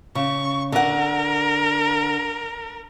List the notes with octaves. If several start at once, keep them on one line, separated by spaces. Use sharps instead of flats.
C#3 C#6
D3 A#4 F#5